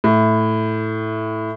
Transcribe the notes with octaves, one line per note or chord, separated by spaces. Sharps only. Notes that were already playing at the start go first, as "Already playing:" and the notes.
A2